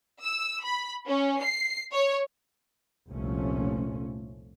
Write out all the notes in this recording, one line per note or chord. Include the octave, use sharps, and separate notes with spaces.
E6
B5
C#4
C7
C#5
F1 C2 A#2 F3 A3 C#4